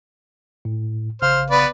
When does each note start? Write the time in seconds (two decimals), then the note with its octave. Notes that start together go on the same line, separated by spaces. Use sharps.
0.65 A2
1.22 A1 C#3 C5 F5 F6
1.50 B3 B4 D5